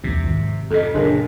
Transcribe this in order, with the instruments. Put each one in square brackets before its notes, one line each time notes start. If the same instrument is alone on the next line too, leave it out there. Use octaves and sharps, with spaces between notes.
[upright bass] E2 F3 [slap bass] C3
[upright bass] G#2 D#3
[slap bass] F2 C3 [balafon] A4 D#5
[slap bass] F#1 A#2 [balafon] D4 G#4 A#4